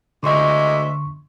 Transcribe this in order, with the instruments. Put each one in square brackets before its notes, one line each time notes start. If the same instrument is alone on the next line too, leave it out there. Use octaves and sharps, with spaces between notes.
[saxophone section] D2 G#3 E5 [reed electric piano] D3 C6 C#6